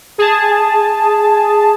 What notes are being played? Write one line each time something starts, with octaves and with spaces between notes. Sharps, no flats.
G#4 A5